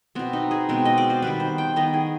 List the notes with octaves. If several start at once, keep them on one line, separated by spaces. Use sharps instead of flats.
B2 B3 C4
D#4
G#4
B2 G#3 C4
D#5
D5
C5
D#3 G3 B3 B4
C5
G5
D#3 B3 D#5
G#4